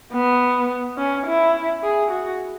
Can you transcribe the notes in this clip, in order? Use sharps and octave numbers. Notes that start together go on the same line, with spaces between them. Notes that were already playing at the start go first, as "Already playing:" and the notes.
B3
C#4
E4
G#4
F#4